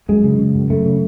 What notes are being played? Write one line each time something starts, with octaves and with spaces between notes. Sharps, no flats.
F#2 G#3
C#3
C#3
F#2
F#2 A3
C#3